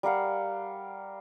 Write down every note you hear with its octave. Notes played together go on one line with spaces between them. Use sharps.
G3 A#4 F5 F#5